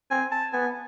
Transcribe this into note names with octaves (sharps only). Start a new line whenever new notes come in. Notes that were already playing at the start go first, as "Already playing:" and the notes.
C4 G#5
A5
B3 G#5